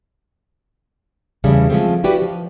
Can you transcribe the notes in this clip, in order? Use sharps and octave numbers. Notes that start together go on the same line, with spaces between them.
E2 C#3 G3 A3
F3 G#3 A3 C4
E4 F#4 G4 B4 D5
F3